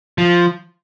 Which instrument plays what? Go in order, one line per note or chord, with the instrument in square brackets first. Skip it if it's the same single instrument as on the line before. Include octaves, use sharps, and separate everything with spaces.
[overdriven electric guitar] F3